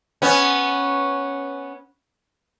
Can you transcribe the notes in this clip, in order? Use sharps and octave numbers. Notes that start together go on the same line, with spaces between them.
B3 C#4